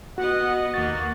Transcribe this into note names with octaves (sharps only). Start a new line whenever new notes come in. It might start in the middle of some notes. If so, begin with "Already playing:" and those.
B3 F#4 D#5 F#5
D#2 A#3 F#4 A6